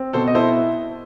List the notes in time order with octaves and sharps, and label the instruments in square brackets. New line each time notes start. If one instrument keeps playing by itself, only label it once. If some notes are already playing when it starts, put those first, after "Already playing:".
Already playing: [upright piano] C4
[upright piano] B2 [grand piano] A4 C5
[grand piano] D#5
[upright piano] E4 [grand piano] A4 C5